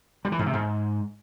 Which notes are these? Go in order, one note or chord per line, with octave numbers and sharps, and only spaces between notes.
G3
E3
G#2
C3
G#2